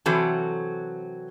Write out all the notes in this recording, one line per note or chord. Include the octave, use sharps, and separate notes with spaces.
C3 E3 F#3 C4 F#4 A4